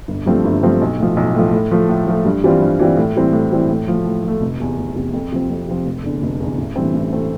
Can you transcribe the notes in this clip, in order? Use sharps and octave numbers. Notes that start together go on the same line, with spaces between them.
G1
G2 F3 A3 C4
G1
G2 F3 A3 C4
B1
A2 F3
B1
A2 F3
A2
F3 A3
A2
F3 A3
G2
E3 G3 C4 F4
G2
E3 G3 C4 F4
A2
E3 G3 C4 E4
A2
E3 G3 C4 E4
A2
F3 A3
A2
F3 A3
F1
E2 C3
F1
E2 C3
F2
C3 F3 C4
F2
C3 F3 C4
F1
E2 D3
F1
E2 D3
A1
G2 E3 A3 C4
A1
E3 A3 C4